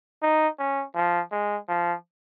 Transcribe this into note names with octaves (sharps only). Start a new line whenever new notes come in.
D#4
C#4
F3
G#3
F3